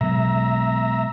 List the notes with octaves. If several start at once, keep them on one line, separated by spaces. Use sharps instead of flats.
B2 F#3 G#3 E5 A#5